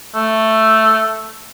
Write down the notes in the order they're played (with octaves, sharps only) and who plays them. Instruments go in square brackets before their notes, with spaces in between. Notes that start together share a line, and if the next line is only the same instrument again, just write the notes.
[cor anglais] A3